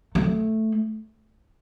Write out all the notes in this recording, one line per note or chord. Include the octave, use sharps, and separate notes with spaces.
A3